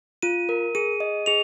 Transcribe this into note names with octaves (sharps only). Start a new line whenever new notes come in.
F4 D#7
A#4
G#4 D#7
D#5
G#4 F7